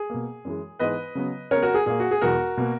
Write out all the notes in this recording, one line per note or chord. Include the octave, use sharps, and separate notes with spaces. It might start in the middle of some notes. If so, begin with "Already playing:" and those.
Already playing: G#4
B2 A#3
F#2 E3 G#3
G#2 E3 G#3 B3 B4 D#5
C#3 F#3 B3
C#3 G#3 B3 A#4 C#5
F#4 A#4
G#4
A#2 A#3 G#4
F#4
G#4
E2 B2 G#3 B3 F#4 A#4
B2 A#3